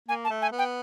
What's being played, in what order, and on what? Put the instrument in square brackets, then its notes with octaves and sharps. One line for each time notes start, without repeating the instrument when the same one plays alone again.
[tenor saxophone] A#3 [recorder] G#5
[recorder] A5
[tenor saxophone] A3
[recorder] G#5
[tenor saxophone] B3
[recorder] G5